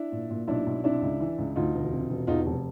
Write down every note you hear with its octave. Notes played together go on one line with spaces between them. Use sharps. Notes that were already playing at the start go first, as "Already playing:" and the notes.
Already playing: D4 E4
A#2
A#2
B1 D4 E4
B1
C3 D4 E4
C#2
E3
C#2
D2 D#4 F4
E1
C3
E1
E2 D#4 F4
F1